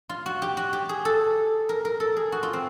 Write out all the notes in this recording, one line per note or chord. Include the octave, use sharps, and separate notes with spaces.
F4
F#4
G4
F#4
G4
G#4
A4
A#4
A#4
A4
G#4
F#4
F4
C4